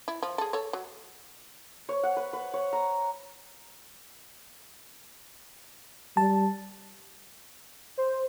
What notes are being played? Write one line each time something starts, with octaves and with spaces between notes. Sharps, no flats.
E4
F3
G#4 A4
A4 C#5
F#3
C#5
F#5
B4
B4
C#5
A#5
G3 A5
C5